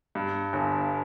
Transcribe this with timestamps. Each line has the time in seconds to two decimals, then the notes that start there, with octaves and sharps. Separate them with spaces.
0.15 G2
0.53 G1